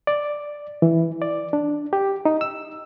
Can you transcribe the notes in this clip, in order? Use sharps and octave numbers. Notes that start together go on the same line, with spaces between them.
D5
E3
D5
D4
G4
D#4
E6